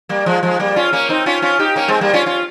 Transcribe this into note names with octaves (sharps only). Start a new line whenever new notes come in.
G3 A#3
F3 G#3
F3 G#3
G3 A#3
C#4 F4
A#3 C#4
C4 D#4
C#4 F4
C#4 F4
D#4 G4
A#3 C#4
G#3 C4
G3 A#3
C#4 F4
C#4 F4